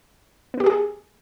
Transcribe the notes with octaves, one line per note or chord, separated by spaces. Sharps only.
B3
G4
G#4